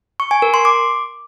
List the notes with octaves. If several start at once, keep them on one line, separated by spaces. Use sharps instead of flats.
C#6
G#5
A#4
C6
D6